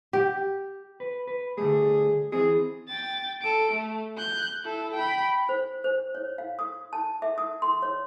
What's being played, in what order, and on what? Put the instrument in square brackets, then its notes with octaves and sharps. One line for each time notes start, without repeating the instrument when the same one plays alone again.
[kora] G4
[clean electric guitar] B4
B4
[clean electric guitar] D3 G3 A3 [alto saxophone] G#4
[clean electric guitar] E3 C4 [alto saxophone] G#4
[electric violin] G5 A6
A4 D7
A3
F#6 G6
E4 A4
G5 B5
[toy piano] C5
C5
C#5
F5
D#6
A5
E5
D#6
C6
C#5